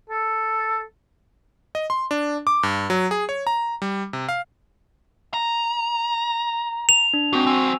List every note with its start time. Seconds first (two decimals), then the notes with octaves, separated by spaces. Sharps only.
0.09 A4
1.75 D#5
1.90 C6
2.11 D4
2.47 D6
2.63 G2
2.90 F#3
3.11 G#4
3.29 C#5
3.47 A#5
3.82 G3
4.13 C3
4.29 F5
5.34 A#5
6.89 F7
7.13 D4
7.33 G#2 C4 F#4
7.46 F#3 C4 G#5 E6